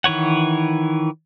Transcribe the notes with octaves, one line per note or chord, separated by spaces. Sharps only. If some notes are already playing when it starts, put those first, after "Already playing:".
D#3 E3 B4 C#5 F#5